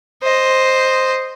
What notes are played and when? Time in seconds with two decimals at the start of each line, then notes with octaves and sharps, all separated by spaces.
0.23 C5 D#5